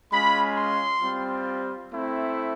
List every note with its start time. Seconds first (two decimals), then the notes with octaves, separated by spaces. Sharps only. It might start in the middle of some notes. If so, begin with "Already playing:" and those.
0.12 G#3 C#4 F4 B5
0.57 C6
1.01 G3 C4 F4
1.90 A3 C4 E4